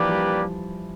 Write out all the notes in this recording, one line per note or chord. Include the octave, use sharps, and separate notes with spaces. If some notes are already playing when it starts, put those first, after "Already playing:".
Already playing: E3 F3 A#3 D4 G4 B4 D5
G3